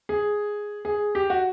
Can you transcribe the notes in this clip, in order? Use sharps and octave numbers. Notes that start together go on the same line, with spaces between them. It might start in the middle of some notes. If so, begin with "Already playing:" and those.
G#4
G#4
G4
F#4